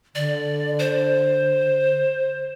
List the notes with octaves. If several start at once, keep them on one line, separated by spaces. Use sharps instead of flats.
D3 D5
C5